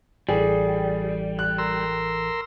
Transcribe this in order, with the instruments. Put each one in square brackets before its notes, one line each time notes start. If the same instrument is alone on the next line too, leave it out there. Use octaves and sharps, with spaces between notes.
[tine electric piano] A1 E3 A4 [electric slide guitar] G3 [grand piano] G#4
[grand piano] F#6
[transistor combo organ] A#4 C6 E6